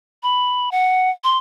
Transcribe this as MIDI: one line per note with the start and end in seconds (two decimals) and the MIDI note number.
0.23 0.71 83
0.71 1.11 78
1.24 1.38 84